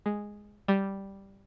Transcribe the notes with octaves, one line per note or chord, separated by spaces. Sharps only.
G#3
G3